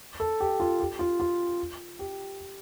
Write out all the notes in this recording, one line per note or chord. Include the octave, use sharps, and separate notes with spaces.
A4
G4
F4
G4
F4
F4
G4